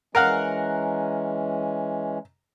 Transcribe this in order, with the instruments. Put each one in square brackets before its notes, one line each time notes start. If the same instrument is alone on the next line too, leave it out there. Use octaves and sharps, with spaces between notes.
[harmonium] E3 G#3 C#4 [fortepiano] A#4 F5 F#5